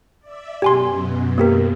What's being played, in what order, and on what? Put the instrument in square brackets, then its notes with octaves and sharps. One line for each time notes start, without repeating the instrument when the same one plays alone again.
[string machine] D5 E5
[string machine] F#2 B2 [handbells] G4 G#5 C6
[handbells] A#3 G4 A#4